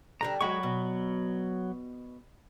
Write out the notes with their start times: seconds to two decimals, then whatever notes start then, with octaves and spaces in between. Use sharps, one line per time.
0.21 D3 G3 D4 A#5
0.41 F#3 G#3 F#4 B5 C#6
0.63 B2